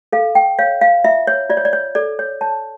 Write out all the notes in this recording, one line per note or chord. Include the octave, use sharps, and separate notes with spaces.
A4 F5
G5
C#5 F5
F5
F4 E5
C#5
F4 D5
C#5
D5
C#5
A4 D5
C#5
C#5 A5